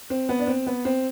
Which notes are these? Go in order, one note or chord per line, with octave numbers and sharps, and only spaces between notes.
C4
B3
D4
C4
B3
C4